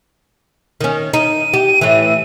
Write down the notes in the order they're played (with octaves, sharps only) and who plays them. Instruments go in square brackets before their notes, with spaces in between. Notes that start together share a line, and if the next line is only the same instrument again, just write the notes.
[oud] D#3 C#4
[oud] D#4 [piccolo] D#7
[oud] G4
A2 E3